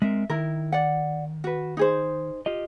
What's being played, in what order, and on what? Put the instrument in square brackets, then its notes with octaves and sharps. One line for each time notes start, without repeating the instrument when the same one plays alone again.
[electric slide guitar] G#3 C4 A#4 [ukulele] E5
[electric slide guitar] D#3 [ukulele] E4 A#4
[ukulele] D5 F#5
F#4 B4
D#4 G#4 C5
[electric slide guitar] F4 G4 D#5